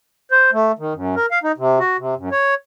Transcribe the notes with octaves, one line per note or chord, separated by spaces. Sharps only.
C5
A3
D#3
F#2
A#4
F5
D#4
C3
F#4
C3
F#2
C#5